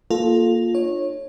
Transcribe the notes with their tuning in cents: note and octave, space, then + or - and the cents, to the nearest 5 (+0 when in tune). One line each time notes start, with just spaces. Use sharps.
A#3 +0 F4 +5 A4 -15
D4 +45 C#5 -15